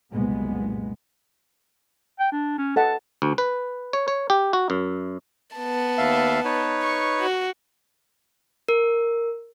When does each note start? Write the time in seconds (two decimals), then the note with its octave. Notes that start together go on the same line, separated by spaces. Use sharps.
0.12 F#1 C2 A#2 G#3 B3
2.20 G5
2.32 D4
2.58 C#4
2.76 A4 D#5 F#5 A5
3.22 D2
3.38 B4
3.93 C#5
4.08 C#5
4.30 G4
4.53 F#4
4.70 F#2
5.57 B3 A5
5.98 D#2 E5 F5
6.45 D#4 B4 C#5
6.82 C#6
7.20 F#4
8.69 A#4